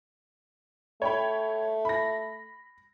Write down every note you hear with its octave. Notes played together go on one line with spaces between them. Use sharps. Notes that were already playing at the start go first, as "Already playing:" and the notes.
A3 C#5 G5 B5
B5 A#6